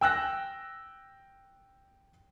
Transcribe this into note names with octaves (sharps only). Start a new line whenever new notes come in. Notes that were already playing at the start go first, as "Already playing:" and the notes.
G5 E6 F#6 A#6